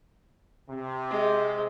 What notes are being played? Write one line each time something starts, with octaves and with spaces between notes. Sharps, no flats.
C3
G#3